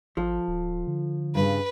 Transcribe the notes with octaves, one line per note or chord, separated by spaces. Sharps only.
G#1 F3 A4
D1
D3
G2 C#3 B4